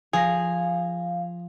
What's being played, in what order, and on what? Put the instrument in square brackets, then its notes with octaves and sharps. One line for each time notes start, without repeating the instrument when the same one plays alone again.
[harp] F3 A#6 [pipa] G#4 [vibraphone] F5